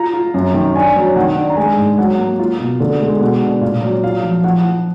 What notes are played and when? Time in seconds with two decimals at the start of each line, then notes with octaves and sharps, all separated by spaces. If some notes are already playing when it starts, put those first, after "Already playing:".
Already playing: F4 A#5
0.14 F4
0.34 F#2
0.54 D#3
0.75 D4 G#5
0.96 F#3
1.16 D#3 F#5
1.36 D4
1.50 A#5
1.57 G#3 G#5
1.78 G#2
1.98 F#3 F#5
2.18 A#3
2.39 F4
2.60 B2
2.80 D3
3.01 G#3
3.21 B2 F#5
3.42 D4
3.61 A#2 F5
3.82 F#3
4.03 F4 F5
4.23 F3
4.44 F3 F#5
4.65 F3